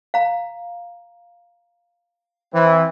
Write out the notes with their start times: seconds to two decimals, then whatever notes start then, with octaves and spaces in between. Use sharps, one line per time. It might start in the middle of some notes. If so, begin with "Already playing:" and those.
0.14 F5 A#5
2.53 E3 C4